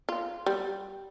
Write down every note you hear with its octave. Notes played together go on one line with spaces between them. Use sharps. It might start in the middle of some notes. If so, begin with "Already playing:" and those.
F4
G3